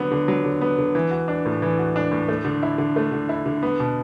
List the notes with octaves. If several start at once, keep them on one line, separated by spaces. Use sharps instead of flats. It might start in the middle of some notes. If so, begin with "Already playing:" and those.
Already playing: D3 F#3 B3
D3
F#3
D3
B3
D3
E3
F#4
D4
A2
E3
F#4
D4
A2
A3
D3
E4
D3
A3
D3
E4
D3
B3
B2